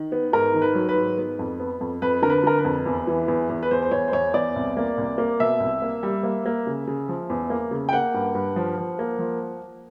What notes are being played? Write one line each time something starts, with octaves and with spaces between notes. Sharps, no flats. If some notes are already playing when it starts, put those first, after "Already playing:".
Already playing: D#3
B3
G#2 A#4
D#3
B4
F#3
B4
G#2
B3
F2
B3
F2
F2 B4
D3 A#4
B4
D3 A#4
B4
F2
E2
E3
E2
E2
B4
E2 C5
C5
E2 C#5
C5
E2 C#5
E2 D5
C2
A#3
C2
A#3
B2 E5
C2
A#3
G3
A#3
A#3
C#3
C#3
F3
E2
A#3
C#3
G5
A#3 F#5
G2
G2
F3
F3
A#3
F3